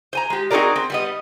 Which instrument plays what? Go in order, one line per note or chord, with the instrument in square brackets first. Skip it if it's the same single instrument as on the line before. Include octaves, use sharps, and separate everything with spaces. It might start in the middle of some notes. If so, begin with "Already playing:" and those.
[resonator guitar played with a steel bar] C5 G#5 A#5
G#3 G4
C4 D#4 F#4 G#4 A#4 D5
C4
G3 B3 D#5